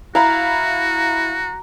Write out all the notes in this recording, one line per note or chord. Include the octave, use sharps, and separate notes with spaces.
E4 F#4 F5 A#5 B5